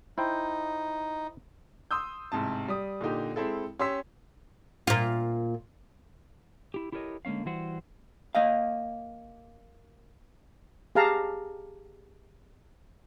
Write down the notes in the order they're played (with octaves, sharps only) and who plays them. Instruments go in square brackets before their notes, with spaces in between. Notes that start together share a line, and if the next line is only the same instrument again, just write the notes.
[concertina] D#4 [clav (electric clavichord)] E4 C5 G5
[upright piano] C6 D#6 E6 G6
A1 G#2 C3 A5
G3 D#6
A#2 D3 D#4 G4
G#3 C4 E4 A4
C#4 G4 C6 E6 B6
[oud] A#2 F4
[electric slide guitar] E4 G4
E4 G4 A4 A#4 C#5 D#5
D3 G#3 A#3 C#4 F5
E3 G3 E4 F#4 C5 F#5
[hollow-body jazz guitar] A#3 D#5 F5
[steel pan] G4 G#4 F5 A5 A#5